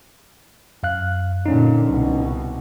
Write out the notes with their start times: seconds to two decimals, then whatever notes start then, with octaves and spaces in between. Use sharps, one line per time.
0.83 F#2 F5 F#6
1.46 A#2 D3 C#4 D#4
1.87 C2 B2